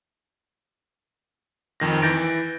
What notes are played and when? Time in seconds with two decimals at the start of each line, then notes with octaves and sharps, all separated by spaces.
1.80 F2 D#3 A#6
2.02 E3 G6 A6 A#6 D7